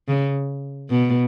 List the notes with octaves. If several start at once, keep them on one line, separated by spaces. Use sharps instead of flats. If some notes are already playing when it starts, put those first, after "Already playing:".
C#3
B2